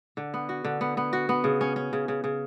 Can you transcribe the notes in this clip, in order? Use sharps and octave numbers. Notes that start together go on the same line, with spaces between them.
D3
B3
F#4
D3
B3
B3
F#4
B3
C#3
C#4
C#4
C#3
C#3
C#3